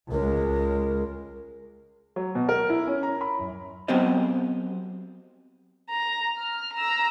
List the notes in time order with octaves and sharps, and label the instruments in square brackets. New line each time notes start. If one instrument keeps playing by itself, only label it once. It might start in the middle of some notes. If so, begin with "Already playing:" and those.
[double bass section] C#2 G#3 [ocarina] A#4
[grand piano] F#3
B2
A#4
E4
C#4
A#5
B5
F#2
[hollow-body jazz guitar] F#3 B3 C4 G4 C5 D#5
[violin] A#5
F6
A#5 E6